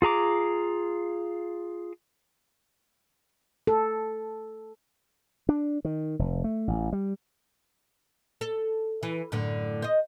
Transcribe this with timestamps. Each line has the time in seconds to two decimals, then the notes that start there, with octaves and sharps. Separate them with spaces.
0.02 F4 G#4 A#5 D6
3.67 A4
5.49 D4
5.85 D#3
6.19 F1
6.44 A3
6.68 A1
6.93 G3
8.41 A4
9.03 E3
9.32 F#2 A2 D3
9.82 C5 D#5